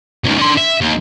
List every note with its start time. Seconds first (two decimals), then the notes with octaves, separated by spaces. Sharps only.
0.24 C#2 D#3
0.38 D3 C6
0.57 E5
0.81 D#2